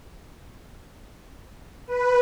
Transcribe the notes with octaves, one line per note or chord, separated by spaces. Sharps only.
B4